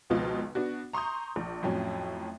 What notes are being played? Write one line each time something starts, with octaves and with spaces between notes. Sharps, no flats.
G#1 C#2 B2 F3 F4 D#5
B3 D4 F#4
A#5 C6 C#6 D#6 G6
A#1
F2 A2 F#3 C#4